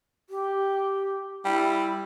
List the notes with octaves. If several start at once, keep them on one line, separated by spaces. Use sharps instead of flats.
G4
G3 E4